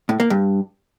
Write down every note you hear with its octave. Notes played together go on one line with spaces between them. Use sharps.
A2
A#3
G2